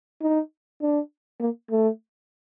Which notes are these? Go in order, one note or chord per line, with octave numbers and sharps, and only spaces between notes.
D#4
D4
A#3
A3